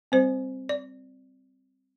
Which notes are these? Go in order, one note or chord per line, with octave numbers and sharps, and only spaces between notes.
G3 C4 C5
D5